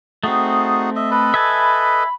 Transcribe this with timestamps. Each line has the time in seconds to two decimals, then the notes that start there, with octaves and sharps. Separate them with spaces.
0.24 A3 C4 D#4 F#4 G#4
0.96 D#5 E5
1.11 A4 B4 D#5 B5
1.34 E5 G#5 A5